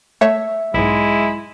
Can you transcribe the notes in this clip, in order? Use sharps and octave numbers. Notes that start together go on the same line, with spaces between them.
A3 C#5 E5
B1 G#2 G#3 E4